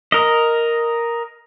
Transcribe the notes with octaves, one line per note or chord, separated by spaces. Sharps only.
A#4 D#5